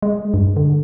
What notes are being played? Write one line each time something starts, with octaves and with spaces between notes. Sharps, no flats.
G#3
G2
D3